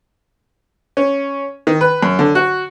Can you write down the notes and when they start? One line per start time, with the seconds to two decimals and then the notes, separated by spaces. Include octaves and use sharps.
0.97 C#4
1.67 D#3
1.81 B4
2.03 F#2
2.19 D3
2.35 F#4